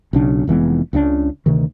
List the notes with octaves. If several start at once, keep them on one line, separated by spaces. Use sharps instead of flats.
B1 C#3 D4
F1 E3 G#3 B3
C#2 C#3 C#4 D4
D2 C3 D#3